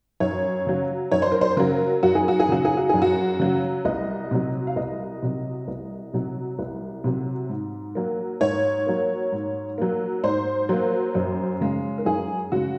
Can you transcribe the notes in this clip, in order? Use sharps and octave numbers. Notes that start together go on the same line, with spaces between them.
F#2 C#5
C#3 F#3
F#2 C#5
C5
A#4
C5
C#3 F#3 A#4
F#2 F#4
G#4
F#4
G#4
C#3 F#3 F#4
G#4
F#4
F#2 G#4
F#4
C#3 F#3
C2 D#5
C3 F#3
F5
C2 D#5
C3 F#3
C2
C3 F#3
C2
C3 F#3
G#2
F#3 A#3
G#2 C#5
F#3 A#3
G#2
F#3 A#3
G#2 C5
F#3 A#3
F#2
C#3 G#3
A#4
F#2 G#4
C#3 G#3 F#4